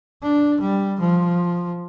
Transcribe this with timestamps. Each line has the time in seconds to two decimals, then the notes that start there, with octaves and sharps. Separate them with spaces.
0.23 D4
0.61 G3
1.00 F3